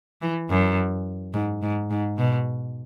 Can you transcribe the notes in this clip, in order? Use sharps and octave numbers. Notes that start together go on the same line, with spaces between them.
E3
F#2
G#2
G#2
G#2
B2